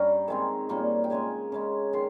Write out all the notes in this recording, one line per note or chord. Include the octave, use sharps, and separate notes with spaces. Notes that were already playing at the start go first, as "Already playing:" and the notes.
Already playing: G2 G3 C#4 A#5
D#3 G#3 C4 G#5
A#2 G3 A#3 C#4
G5
C#3 G#3 C#4 G#5
C#3 G#3 C#4
D#3 G#3 C6